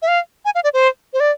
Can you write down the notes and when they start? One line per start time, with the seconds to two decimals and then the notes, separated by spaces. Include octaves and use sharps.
0.02 E5
0.08 F5
0.45 G#5
0.55 F5
0.64 D5
0.74 C5
1.13 C5
1.20 D5